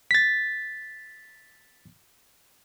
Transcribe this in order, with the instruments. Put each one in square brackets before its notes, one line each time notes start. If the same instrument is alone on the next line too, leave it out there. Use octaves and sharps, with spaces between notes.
[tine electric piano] A6 B6